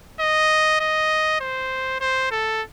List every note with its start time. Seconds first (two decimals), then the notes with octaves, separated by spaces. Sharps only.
0.20 D#5
0.80 D#5
1.41 C5
2.00 C5
2.31 A4